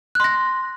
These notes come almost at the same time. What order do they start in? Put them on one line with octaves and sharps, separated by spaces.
F#6 C6 A#6